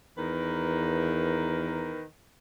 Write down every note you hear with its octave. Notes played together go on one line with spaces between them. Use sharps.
E2 D#3 A#4 B4